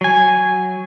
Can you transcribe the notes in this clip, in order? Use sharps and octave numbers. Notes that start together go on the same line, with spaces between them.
F#3 G#5